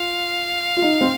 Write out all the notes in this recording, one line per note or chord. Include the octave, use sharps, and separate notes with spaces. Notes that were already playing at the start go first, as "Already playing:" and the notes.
Already playing: F4 F5
F4
D#4
C4